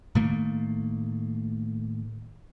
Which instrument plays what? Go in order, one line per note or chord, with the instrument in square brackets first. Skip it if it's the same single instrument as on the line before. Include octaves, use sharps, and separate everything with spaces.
[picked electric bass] A2 D#3 A3 A#3